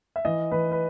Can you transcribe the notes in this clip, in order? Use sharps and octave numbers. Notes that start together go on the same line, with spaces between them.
E5
E3 D#5
E3 B4
B4